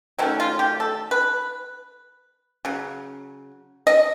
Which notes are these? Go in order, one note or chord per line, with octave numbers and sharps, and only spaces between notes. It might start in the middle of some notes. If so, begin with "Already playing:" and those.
D#3 F#3 A3 C#4 E4
F4
G4
A4
B4
C#3 F#3
D#5